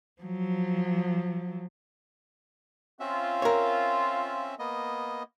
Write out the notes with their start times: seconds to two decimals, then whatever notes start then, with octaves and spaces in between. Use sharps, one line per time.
0.22 F3 F#3
3.00 C4 C#4 F4 E5
3.42 A#4 C#5
4.59 A#3 B3 D#5